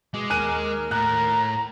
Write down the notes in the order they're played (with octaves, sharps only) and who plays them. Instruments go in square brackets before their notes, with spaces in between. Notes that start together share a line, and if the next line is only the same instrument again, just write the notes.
[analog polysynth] B2 [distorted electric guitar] G#3 [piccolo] D6
[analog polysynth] D#2 A#4 F6 [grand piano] G#5 F#6 D#7
[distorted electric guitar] A2 [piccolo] A#5 [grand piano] F#6